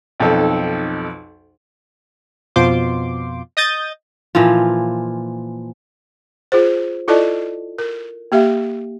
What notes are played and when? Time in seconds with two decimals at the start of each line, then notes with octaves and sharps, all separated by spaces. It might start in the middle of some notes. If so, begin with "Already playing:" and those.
0.20 B1 F2 D#4 A4
2.56 F2 B2 F4 C5 C6 D6
3.57 D#5 D#6 G6 A6
4.35 A#2 E3 F3 F4
6.52 F4 G#4 C5
7.08 E4 F4 A4 D5 D#5 A5
7.79 A#4
8.32 A#3 G4 E5 F5